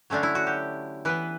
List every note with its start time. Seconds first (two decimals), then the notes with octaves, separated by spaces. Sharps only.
0.10 D3 F#3 A3 C#4 D4
0.23 E4
0.35 F#4
0.47 G4
1.05 E3 B3 B4